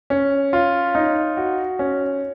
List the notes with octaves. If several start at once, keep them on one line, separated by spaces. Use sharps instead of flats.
C#4
F4
D#4
F#4
C#4